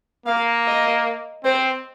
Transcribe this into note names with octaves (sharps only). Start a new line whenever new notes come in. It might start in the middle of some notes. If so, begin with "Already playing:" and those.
A#3 F5
D#5
C4 C5